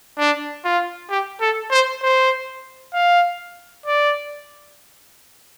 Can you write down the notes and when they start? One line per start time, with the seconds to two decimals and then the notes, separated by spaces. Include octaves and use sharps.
0.18 D4
0.64 F4
1.10 G4
1.41 A4
1.71 C5
2.03 C5
2.93 F5
3.86 D5